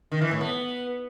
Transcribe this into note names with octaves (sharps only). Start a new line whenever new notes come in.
D#3
E3
A2
B3